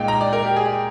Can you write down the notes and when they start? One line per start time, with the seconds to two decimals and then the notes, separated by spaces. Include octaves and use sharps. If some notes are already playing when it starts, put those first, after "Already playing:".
Already playing: A#2 G#3 D#4 F5 G5
0.08 A#5
0.21 D5
0.33 A#4
0.45 G4
0.56 G#4